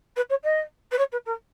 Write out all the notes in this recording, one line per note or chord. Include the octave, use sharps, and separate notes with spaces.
B4
C#5
D#5
B4
C#5
B4
A#4